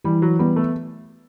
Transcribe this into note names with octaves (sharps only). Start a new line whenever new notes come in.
E3 G3
F#3
G3 B3
A3